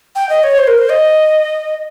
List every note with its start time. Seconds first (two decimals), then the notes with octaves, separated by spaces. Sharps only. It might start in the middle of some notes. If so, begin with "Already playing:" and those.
0.15 G5
0.29 D#5
0.43 C#5
0.58 C5
0.67 A#4
0.78 C5
0.89 D#5